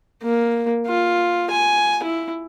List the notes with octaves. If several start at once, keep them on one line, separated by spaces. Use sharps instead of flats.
A#3
F4
G#5
E4